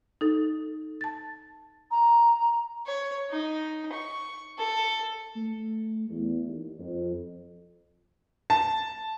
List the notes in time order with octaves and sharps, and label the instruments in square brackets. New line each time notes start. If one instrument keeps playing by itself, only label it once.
[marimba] D#4 A4
A5 A6
[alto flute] A#5
[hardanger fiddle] C#5
D#4
C#6
A4
[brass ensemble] A3
E2
D#2
F2
[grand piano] A5